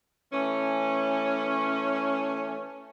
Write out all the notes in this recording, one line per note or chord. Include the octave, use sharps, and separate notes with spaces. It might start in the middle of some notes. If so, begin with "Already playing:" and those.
E3 A3 C#4